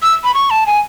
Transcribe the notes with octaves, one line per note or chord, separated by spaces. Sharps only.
E6
B5
C#6
A5
G#5